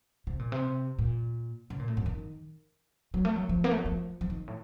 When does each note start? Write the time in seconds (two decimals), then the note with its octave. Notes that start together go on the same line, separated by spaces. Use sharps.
0.27 C3
0.39 A#2
0.52 C3
0.98 A#2
1.70 C#3
1.80 A#2
1.88 A2
1.97 F#2
2.06 D#3
3.14 F#3
3.25 A3
3.36 F#3
3.49 F3
3.64 A#3
3.71 A3
3.78 F#3
3.85 F3
4.21 F3
4.30 D#3
4.48 A2